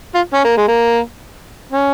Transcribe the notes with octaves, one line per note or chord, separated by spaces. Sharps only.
F4
C#4
A#3
G#3
A#3
C#4